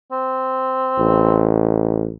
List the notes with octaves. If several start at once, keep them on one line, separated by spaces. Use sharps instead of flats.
C4
A1